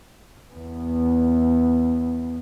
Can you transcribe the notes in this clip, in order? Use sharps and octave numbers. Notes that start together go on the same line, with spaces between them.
E2 B3